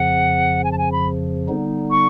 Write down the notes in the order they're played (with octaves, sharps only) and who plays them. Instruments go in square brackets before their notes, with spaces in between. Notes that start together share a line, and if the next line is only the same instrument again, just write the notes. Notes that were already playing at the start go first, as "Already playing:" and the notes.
Already playing: [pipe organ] F2 C#3 F3 [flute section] F#5
[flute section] G#5
A5
G#5
B5
[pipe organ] D3 G3 B3 D#4
[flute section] C#6